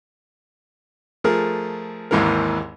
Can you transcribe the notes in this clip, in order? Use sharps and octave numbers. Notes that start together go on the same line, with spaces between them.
F3 A3 G#4 A#4
G#1 D#2 G#2 E3 G#3 A#4